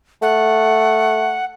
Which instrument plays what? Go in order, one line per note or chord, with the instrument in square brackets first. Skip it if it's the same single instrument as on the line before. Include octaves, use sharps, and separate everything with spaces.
[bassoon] A3 [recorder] F#5